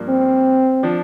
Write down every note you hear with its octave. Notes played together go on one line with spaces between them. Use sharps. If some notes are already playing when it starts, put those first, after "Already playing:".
Already playing: G2 F3 A#3
C4
F3 D4